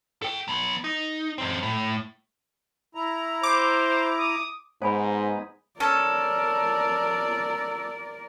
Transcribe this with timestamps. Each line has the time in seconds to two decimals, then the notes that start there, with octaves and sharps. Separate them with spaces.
0.22 A4 G5
0.48 F#3 B3
0.84 D#4
1.38 F#2 C4
1.63 A2
2.95 E4 A#5
3.43 C5 D6
4.19 D#6
4.82 G#2 G#3 B3 D#4 C5 G#5 B5
5.80 C#4 A4 A#4 D5